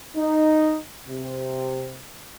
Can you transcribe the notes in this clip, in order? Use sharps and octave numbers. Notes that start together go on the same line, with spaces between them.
D#4
C3